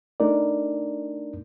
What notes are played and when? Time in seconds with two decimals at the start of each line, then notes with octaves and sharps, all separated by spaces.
0.20 A3 D4 D#4 A#4 D5